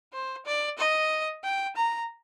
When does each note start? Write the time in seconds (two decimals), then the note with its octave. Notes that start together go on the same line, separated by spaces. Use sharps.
0.13 C5
0.46 D5
0.78 D#5
1.44 G5
1.76 A#5